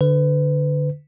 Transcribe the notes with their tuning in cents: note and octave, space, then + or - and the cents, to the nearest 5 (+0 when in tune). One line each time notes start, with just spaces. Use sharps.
D3 +0 B4 +30